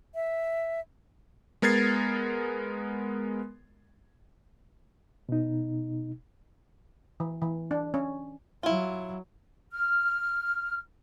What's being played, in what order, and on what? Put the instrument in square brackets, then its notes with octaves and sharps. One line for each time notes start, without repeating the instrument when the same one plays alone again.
[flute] E5
[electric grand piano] G#3 B3 A#4 G#6 A6 C7
[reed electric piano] B2 D#4
[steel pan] E3
E3
D4
C#4
[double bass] F#3 [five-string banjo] E4 F4
[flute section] F6